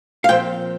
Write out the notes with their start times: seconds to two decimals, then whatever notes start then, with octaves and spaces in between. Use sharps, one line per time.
0.24 F5
0.28 A#2 F3 C4 G5